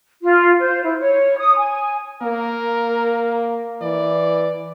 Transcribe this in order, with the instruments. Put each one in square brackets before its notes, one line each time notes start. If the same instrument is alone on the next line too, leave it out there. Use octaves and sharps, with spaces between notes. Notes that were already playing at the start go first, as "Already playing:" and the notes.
[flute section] F4
C5
E4
C#5
D#6
G#5
[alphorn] A#3 [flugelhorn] A#4
[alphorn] E3 [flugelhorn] D5